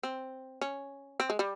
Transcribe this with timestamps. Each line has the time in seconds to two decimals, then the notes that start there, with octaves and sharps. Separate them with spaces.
0.03 C4
0.61 C#4
1.20 C4
1.30 G#3
1.39 G3